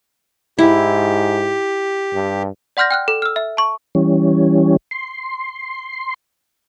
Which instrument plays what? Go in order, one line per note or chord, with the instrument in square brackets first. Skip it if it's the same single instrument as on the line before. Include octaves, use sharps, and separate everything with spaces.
[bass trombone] G#2 [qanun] E4 [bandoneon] G4
[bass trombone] G2
[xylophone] D5 F#5 C6 F6 G6 A#6
G5 F6 F#6
A4
E6 F6
E5
A5 C#6
[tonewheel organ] E3 G3 C#4
C6